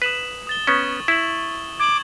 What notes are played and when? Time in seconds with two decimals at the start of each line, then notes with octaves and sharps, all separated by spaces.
0.02 B4 D#6 E7 F#7
0.47 D#6 A6 G7
0.67 B3 C#4 C#6
1.08 E4 E7 F#7
1.80 D6 G#6 F#7